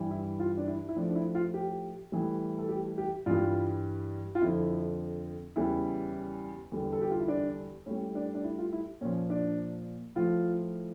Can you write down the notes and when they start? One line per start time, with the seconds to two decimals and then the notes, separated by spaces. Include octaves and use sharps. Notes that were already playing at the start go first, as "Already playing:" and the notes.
Already playing: G2 E3 G3
0.11 E4
0.40 F4
0.58 D4
0.68 E4
0.89 E4
0.96 A2 F3 D4
1.10 D4
1.15 E4
1.35 F4
1.54 G4
2.12 A2 E3 G3
2.59 A4
2.69 G4
2.98 G4
3.26 G2 E3 G3 F4
4.35 F4
4.41 F2 D3 F3 E4
5.56 E2 C#3 G3 E4
6.72 E2 D3 G3
6.92 A4
7.01 G4
7.11 F4
7.20 E4
7.28 D4
7.86 A2 G3 C#4
8.15 D4
8.35 D4
8.44 E4
8.58 F4
8.72 E4
9.01 A#2 F3 C#4
9.30 D4
10.15 A2 F3 F4